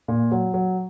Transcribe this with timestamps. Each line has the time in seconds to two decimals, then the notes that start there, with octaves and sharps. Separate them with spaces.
0.08 A#2
0.31 F#3
0.54 F#3